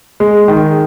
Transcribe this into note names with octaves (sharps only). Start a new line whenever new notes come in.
G#3
D#3